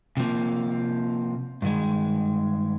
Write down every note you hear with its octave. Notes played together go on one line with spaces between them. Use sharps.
C3 F3 A#3
G2 D#3 G#3